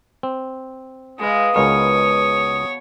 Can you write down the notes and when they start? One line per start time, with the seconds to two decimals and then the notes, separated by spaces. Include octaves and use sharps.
0.23 C4
1.20 G#3 G#4 B4 F5 D#6
1.56 C#2 B2 G#3 A#4 C#5